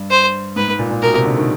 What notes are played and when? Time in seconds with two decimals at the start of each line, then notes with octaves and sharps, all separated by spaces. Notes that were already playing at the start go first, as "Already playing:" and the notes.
Already playing: G2
0.11 C5
0.56 G#2 B4
0.68 G#2
0.79 A#2
0.91 A#2
1.02 B2 A#4
1.14 C3
1.25 D3
1.37 D#3